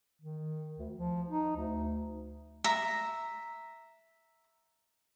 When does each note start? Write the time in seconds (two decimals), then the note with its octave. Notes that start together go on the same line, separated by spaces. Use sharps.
0.22 D#3
0.78 D2
0.94 F3
1.28 D#4
1.56 D2
2.64 E5 A#5